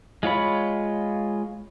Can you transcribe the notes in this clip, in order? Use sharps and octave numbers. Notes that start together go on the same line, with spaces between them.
G#3 F4 C#5 B5